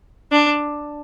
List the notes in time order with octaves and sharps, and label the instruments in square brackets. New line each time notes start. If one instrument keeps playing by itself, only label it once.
[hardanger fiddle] D4